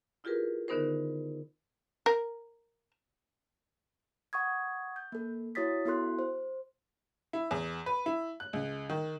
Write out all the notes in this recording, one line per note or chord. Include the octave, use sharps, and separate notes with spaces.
E4 F4 G4 G#4 A#4 B4
D3 D#3 B3 D#4 A#4 C5
A#4
F#5 C#6 D#6 G#6
G6
A#3 A4
E4 F#4 C#5 D#6 A6 B6
B3 E4 F#4 A4 C6 F#6
C5
E4
E2
B4
E4
F#6
C#2
D#3